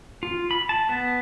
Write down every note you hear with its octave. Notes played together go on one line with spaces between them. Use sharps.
F4
B5
A5
B3